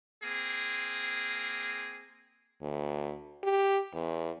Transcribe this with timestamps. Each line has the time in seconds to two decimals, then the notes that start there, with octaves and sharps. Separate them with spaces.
0.23 A#3 C4 G#4
2.62 D2
3.43 G4
3.94 E2